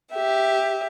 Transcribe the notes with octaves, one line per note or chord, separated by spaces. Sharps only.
G4 E5